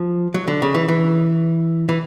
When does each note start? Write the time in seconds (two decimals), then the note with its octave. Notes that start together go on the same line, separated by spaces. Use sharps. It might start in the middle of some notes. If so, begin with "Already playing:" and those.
Already playing: F3
0.34 F#3
0.48 D3
0.62 C#3
0.74 E3
0.88 E3
1.89 E3